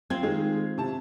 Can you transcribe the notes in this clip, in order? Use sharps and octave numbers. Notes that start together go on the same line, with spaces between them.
C4 F4 G#6
D#3 G#3 G#4
C3 A5